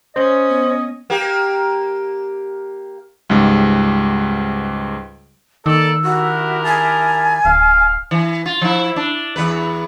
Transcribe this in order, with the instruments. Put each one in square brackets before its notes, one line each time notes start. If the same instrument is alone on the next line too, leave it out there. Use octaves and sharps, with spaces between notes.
[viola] C#4 [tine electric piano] C5 [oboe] D#5
[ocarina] B3
[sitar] A#3 G4
[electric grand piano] C#2 G#2 G3
[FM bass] D#3 [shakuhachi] A#3 [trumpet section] A4 D5 [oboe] E6
[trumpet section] E4 G4 A#4 [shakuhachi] F#4
[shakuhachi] G#5 [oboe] A5
[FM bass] D1 [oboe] F5
[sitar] E3
F4
F3 E4
D4
E2 B4